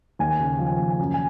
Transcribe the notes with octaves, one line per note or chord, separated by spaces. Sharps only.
D#2 G#5
C#3 G#5
F3
G#5
D#2
G#5
F#2
G#5